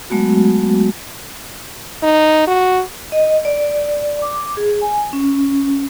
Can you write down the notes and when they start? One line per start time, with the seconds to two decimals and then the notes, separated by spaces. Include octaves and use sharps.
0.10 F#3 G#3 A3 B3 F#4
2.03 D#4
2.47 F#4
3.12 D#5
3.45 D5
4.22 D6
4.57 G#4
4.81 G#5
5.13 C#4